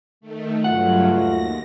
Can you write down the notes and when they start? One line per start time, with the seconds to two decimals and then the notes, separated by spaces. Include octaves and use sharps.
0.21 D#3 A3
0.64 G2 C#3 F#3 A3 F4 F#4 F#5
1.12 D#2 A#6